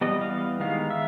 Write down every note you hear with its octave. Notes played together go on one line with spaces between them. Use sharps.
E3 G3 B3 D#5
F5
D#3 G#3 B3 F5
E5